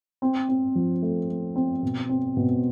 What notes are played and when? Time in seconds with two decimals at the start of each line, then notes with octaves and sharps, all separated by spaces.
0.22 C4
0.49 C4
0.75 F3
1.02 A3
1.29 A3
1.56 C4
1.83 B2
2.09 C4
2.37 B2